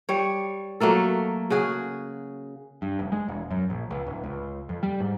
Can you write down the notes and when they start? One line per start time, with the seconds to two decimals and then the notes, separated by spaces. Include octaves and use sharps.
0.09 G3 C#5
0.80 F#3 A3 A#3 A4
1.50 C#3 F#4 G#4
2.82 G2
2.99 F1
3.12 G#3
3.28 E1
3.51 F#2
3.70 A#1
3.91 C#2
4.07 D1
4.24 C#2
4.69 F2
4.83 G3
5.00 G#2